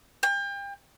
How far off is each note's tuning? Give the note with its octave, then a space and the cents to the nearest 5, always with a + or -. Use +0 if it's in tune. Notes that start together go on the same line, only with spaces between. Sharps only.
G5 +35